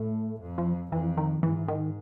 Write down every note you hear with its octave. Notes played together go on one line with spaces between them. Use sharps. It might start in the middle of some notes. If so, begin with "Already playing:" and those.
Already playing: A2 A3
F2
F3
F2 E3
D#3
G#2 E3
D#3